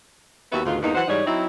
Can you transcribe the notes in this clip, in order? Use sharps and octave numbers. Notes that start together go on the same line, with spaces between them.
D#2 B3 F#4 E5
D2 G#2 B2 D#3 F4
E2 G2 E3 A#3 D#4
E3 F#3 C5 F#5
G#2 E3 G3 D#4 C#5 D5
F#3 C4 D#4 E4